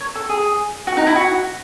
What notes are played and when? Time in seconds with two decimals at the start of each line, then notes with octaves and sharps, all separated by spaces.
0.01 C#5
0.15 A4
0.29 G#4
0.87 F#4
0.97 D#4
1.07 E4
1.16 F#4